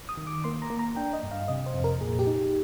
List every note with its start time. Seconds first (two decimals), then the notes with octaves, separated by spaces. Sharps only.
0.09 D#6
0.17 D#3
0.27 D6
0.44 A#3 C6
0.62 A#5
0.70 A#3
0.79 A#5
0.96 D4 G5
1.13 D#5
1.23 G2
1.31 F5
1.48 C3 D#5
1.66 C5
1.74 F2
1.84 A#4
2.01 A#2 G#4
2.19 G4
2.27 D#4
2.36 G4